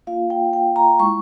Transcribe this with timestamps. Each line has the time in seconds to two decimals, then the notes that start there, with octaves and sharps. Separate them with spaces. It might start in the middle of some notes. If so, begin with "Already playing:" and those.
0.07 A#3 F4 F5
0.30 G5
0.53 G5
0.76 A#5
1.00 G#3 E4 C#6